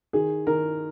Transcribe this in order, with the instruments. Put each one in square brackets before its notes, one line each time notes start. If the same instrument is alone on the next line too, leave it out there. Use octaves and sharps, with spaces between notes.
[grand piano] D#3 G#4
D#3 A#4